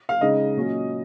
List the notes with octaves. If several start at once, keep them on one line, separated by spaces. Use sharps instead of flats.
F5
C#3 G#3 D#4 D#5
A#2 F#3 C#4